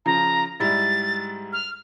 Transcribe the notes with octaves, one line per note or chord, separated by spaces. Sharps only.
C#3 F3 A#5
G#2 G3 E4 A6
F6